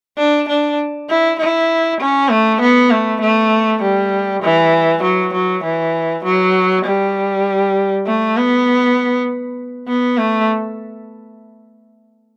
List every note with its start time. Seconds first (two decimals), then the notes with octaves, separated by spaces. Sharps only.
0.18 D4
0.48 D4
1.10 E4
1.39 E4
2.00 C#4
2.30 A3
2.61 B3
2.91 A3
3.21 A3
3.82 G3
4.42 E3
5.03 F#3
5.33 F#3
5.64 E3
6.24 F#3
6.85 G3
8.06 A3
8.37 B3
9.88 B3
10.18 A3